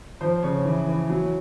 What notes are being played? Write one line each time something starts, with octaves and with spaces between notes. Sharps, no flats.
F3 C5
C#3 C#5
E3
E3
F#3